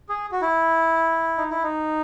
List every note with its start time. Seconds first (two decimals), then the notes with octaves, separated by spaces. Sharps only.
0.09 G#4
0.32 F#4
0.42 E4
1.38 D#4
1.51 E4
1.63 D#4